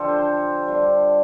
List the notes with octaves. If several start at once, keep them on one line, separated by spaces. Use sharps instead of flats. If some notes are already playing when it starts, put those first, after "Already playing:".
Already playing: D3 F3 D4 F4 G4 A4
C5
D3 G3 D4 F4